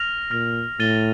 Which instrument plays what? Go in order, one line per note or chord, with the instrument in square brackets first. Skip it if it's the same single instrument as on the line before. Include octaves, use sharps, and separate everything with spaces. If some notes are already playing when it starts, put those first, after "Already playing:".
Already playing: [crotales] F6 A#6 F7
[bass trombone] A#2 [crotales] F6 A#6 F7
[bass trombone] A2 [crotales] A6 D#7 G7